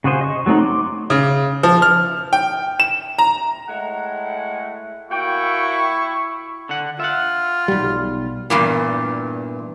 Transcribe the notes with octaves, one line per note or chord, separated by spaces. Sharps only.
C#3 F#4 G#4 C5
D#5 C#6
F#3 A3 C4 D#4 F#4
C6 D6
C#3
F3
F6
G5
E7
A#5
A2 G#3 F#5
A#2 E4 F#4 G5 C#6
D3 F#5
F4 E5 F#5
B1 G3
E2 G2 A#2